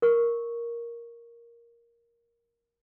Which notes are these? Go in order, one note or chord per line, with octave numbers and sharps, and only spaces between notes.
A#4 C#6